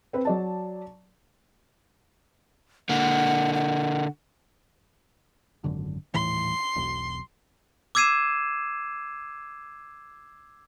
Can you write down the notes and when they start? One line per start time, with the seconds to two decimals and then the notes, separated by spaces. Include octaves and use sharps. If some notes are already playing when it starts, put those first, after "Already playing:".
0.13 C4 B4
0.25 F#3 D5 A5
2.89 D3 A#3 F#5
3.54 F#5
5.64 G#1 F#2 D3
6.14 D#1 A2 E3 C6
6.76 E1 B1
7.95 D6 E6 G#6 C7 D#7 E7